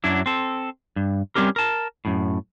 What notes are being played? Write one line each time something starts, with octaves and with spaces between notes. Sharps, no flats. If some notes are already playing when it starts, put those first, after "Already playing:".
F#2 F#3 D4 E4
C4 A4
G2
G3 C4 C#4 G4 A#4
A#4 A5
F#2 A2